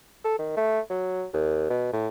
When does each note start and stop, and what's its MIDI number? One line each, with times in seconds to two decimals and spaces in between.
0.24 0.37 69
0.39 0.52 51
0.57 0.80 57
0.90 1.25 54
1.33 1.66 39
1.70 1.90 47
1.93 2.08 45